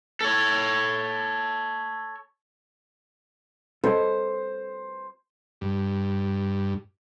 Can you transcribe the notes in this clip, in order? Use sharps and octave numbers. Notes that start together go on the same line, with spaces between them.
A4 C#5
A4 C5 C#5 D#5
G2